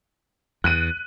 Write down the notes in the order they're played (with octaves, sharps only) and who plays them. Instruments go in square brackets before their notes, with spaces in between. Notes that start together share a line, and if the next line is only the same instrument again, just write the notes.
[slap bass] E2 [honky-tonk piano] F#6 D#7